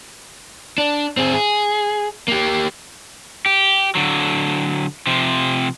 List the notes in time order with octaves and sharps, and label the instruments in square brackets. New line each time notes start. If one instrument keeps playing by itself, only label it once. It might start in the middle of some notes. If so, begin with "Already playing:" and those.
[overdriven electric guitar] D4
C4 G#4
G#4
A#3 G4
G4
D3 F#3
C3 F3